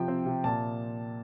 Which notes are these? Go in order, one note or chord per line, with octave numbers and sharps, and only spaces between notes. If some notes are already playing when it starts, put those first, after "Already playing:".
Already playing: C3 F3 G5
C4
C3
A#2 A5